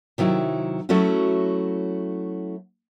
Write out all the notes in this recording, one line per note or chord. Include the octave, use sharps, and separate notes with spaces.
C3 D#3 F#3 E4
F#3 A3 C#4 E4 F#4